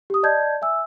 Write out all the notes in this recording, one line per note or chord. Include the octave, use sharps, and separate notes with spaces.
G4 D#6
D5 D#5 A5 G6 G#6
E5 G#5 E6